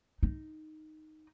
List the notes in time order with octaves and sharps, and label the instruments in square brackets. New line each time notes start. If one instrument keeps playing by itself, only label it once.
[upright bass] D#4